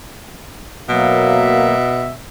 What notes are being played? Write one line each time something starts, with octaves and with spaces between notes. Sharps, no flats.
B2 F#3 A#3 E5